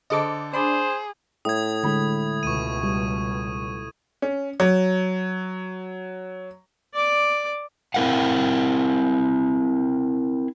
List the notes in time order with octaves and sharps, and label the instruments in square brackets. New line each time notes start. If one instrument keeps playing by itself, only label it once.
[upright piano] D3 A4 C5 [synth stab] D#5 D6
[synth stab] D4 [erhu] G#4 [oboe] C5 [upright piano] B5 D6
[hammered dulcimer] A2 [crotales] D#6 G#6
[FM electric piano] D3 G#3 [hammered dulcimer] B5
[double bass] C#2 B2 [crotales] C#6 D#7
[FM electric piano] G3
[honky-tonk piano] C#4
F#3
[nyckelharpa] D5 D6
[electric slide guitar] C4 E4 A#4 F5 F#5